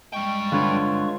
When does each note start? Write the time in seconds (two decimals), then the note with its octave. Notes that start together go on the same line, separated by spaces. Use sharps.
0.14 G2 G#3 G5 C#6
0.52 D3 F4 B4 C#5